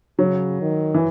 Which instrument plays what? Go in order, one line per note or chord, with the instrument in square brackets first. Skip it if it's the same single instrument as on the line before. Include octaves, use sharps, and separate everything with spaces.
[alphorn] C#3 [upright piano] F#3
[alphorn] D#3
[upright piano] E3